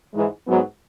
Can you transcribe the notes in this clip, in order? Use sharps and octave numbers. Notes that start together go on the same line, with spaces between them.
G#2 E3 G#3
G#2 F#3 B3